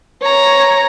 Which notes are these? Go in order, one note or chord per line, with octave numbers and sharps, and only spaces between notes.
C#5 A#5